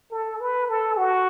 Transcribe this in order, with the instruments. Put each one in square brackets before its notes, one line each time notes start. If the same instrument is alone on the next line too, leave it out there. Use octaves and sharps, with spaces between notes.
[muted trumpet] A4
B4
A4
F#4